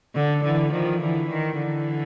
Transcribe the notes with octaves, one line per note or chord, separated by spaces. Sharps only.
D3
D3 E3
D#3 F3
D3 E3
D#3
D3 E3